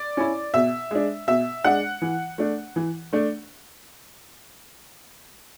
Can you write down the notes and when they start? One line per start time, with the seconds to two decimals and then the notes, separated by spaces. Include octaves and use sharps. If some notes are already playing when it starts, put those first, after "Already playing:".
Already playing: D5
0.17 C#4 E4
0.54 B2 E5
0.91 G#3 D4
1.27 B2 E5
1.64 G#3 D4 F#5
2.02 E3
2.38 A3 D4
2.76 E3
3.13 A3 D4